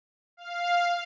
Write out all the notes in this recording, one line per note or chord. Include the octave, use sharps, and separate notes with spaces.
F5